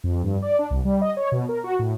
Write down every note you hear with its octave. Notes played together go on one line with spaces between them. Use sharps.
F2
G2
D5
D4
C2
G3
D#5
C#5
B2
A#4
F#4
A2